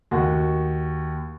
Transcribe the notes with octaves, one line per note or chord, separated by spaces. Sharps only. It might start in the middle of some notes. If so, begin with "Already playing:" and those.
D#2 F#4